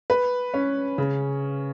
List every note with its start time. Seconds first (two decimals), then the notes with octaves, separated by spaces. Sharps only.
0.10 B4
0.54 C#4
0.98 C#3